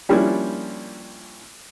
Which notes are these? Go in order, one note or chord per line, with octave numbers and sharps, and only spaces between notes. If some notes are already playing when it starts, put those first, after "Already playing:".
F3 G3 A#3 C#4 D4 E4